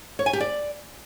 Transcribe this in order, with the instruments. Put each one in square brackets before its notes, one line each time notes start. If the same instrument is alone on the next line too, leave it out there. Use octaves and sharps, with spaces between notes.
[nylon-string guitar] C#5
G#5
G4
D5